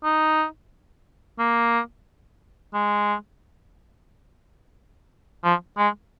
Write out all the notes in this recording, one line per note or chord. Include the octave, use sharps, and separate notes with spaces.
D#4
A#3
G#3
F3
G#3